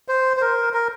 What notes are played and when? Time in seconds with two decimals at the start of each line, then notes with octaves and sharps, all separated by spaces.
0.08 C5
0.37 C5
0.41 A#4
0.73 A#4